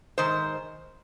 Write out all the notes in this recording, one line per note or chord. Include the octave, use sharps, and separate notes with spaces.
G#2 D#3 C5